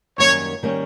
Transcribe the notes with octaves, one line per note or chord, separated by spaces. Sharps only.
F#2 D#3 G3 A#3 C#4 C#5
D#3 G3 A#3 C#4